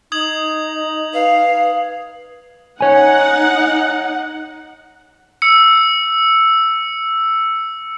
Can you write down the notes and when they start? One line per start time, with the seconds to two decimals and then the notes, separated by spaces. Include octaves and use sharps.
0.12 D#4 D#6 G#6 F#7
1.13 B4 F5
2.81 D#4 C#5 F#5 G#5
5.42 E6 C#7